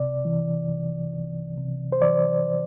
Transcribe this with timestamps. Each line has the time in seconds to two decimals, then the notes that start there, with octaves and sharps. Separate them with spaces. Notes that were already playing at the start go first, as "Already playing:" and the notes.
Already playing: C2 C3 D5
0.25 E3
0.69 C2
1.13 C2
1.58 C3
1.92 C5
2.02 E3 D5